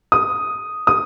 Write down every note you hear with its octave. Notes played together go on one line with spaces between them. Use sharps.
D#6
D#6